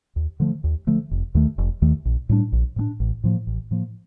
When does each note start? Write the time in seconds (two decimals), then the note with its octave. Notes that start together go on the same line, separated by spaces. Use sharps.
0.16 D#2
0.40 D3 F3 A3
0.64 D#2
0.87 D3 F3 A3
1.11 F1
1.35 D#2 D#3 A3
1.58 F1
1.82 D#2 D#3 A3
2.05 A#1
2.29 A2 G3 D4
2.52 A#1
2.76 A2 G3 D4
3.00 A1
3.24 A2 F3 A#3
3.47 A1
3.71 A2 F3 A#3